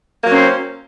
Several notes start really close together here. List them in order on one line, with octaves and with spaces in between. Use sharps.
A#3 F#3 C#4 C4 C5